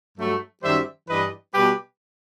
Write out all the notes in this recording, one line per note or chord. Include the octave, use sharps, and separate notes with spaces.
G2 F#3 A3
F#2 D#3 G3 C5 E5
G2 E3 G3 B4 D#5
B2 G3 G4 B4